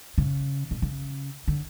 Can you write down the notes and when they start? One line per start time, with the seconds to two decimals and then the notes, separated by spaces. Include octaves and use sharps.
0.18 C#3
0.71 B2
0.82 C#3
1.48 D3